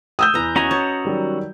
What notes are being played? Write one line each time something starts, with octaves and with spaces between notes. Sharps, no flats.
D#6 E6 G6
E2 E4 B4 A#5
C#4 F#4 D#5 G#5 A#5
C#5 A5 C#6
D#3 F#3 G3